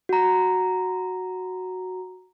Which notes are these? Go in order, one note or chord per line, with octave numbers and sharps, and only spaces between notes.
F#4 A#5